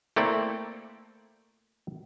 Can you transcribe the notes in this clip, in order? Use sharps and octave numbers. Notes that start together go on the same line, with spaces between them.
A3 A#3 C4 E4 A4 D5